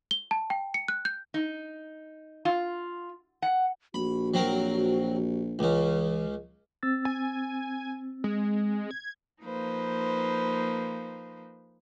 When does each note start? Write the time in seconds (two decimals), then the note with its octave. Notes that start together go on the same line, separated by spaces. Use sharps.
0.11 G7
0.31 A5
0.50 G5
0.74 C#7
0.88 F#6
1.05 G6
1.34 D#4
2.45 F4
3.42 F#5
3.94 A#1 F#4 B5
4.34 F#3 C4 A#4
5.59 C#2 C#3 E3
6.83 C4 E6 A6
7.05 G#5
8.24 G#3
8.91 G#6
9.43 F3 A#3 D#4 B4 C5